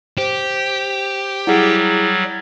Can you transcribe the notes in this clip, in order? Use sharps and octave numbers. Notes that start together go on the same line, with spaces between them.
G4 C5
F#3 G3 E4 G#4 F#5